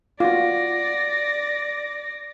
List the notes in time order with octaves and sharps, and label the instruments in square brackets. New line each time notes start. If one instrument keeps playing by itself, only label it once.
[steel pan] F4 F#4 [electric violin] D5 A#6